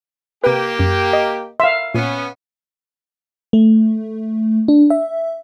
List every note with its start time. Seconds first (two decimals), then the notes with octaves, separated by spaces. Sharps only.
0.44 C3 A#3 G4 B4
0.79 F#2
1.13 D#5
1.60 E5 F5 C6
1.94 A#2 B3 C#4
3.53 A3
4.68 D4
4.90 E5